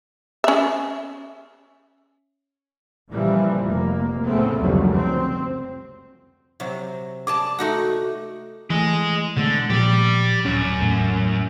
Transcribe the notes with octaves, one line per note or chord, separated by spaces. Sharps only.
C#4 E5
A#2 C#3 E3 F3 G3
F1 A#3
A2 C#3 A3 B3 C4
F1 C#2 F#2 D3 F#3 G3
C4
C3 F#3
G#4 D5 A5 D6
A3 D#4 F#4 F#5
E3 A3 G#4 D#5
B2 D3 G#3 A3
A#2 F3 G4 D5
D1 F#2 C#4
E1 A2